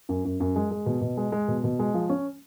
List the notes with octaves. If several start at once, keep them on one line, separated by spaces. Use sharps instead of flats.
F#2
F#2
F#2
G#3
G#3
B2
B2
G#3
G#3
B2
B2
G#3
F3
C#4